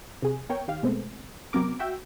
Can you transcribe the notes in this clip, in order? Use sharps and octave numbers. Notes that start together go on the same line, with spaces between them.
C3 G#4
B3 A#4 C#5 G5
D#3 G4 F5
B2 G#3 A3 B3 C4
C3 F#3 B3 C4 A#4 D6
F#4 E5 G5